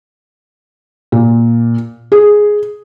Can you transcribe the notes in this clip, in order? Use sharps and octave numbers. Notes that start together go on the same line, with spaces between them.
A#2
G#4